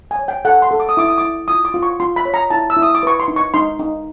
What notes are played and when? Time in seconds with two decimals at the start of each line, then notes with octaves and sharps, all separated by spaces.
0.11 G#5
0.19 C#5
0.28 G5
0.45 A4 F#5
0.62 C6
0.71 A4
0.80 D6
0.89 D#6
0.97 E4 D6
1.08 D#6
1.18 E4 D6
1.48 F4 D#6
1.65 D6
1.74 F4
1.83 C#6
2.00 F4 C6
2.16 B5
2.25 C#5
2.34 A#5
2.50 E4 A5
2.70 E6
2.77 E4
2.82 D#6
2.95 D6
3.03 B4 C#6
3.20 C6
3.28 D#4
3.36 C#6
3.54 D#4 C6
3.79 D#4